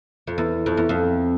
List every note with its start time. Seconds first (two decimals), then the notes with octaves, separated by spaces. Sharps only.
0.27 F2
0.38 E2
0.66 F2
0.77 E2
0.89 F2